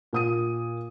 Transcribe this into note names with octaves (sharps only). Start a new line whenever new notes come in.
A#2 D#6 D#7